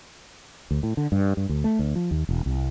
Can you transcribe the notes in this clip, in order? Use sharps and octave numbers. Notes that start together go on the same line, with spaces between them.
D2
A2
D3
G2
G2
D2
A3
D2
F3
D#2
E1
C2